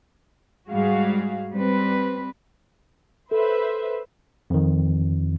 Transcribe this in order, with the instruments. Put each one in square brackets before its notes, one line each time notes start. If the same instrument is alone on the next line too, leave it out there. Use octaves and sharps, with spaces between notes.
[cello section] G#2 G3 G#3 F#4 G#4 F5
G3 C4 B4
[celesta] A4 [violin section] B4 C5 E5
[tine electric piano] F2 D#3